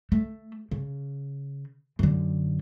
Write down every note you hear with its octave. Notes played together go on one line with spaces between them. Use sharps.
A3
C#3
F#2 D3